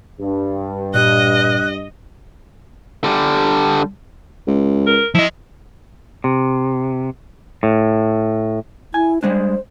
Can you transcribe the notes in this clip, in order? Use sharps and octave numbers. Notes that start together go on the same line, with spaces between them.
G2
A#2 G4 D#5 F#6
D3 G3
C#2
A#4
F3 E4 D#5
C3
A2
E4 G#5
G3 G#3 D4 C5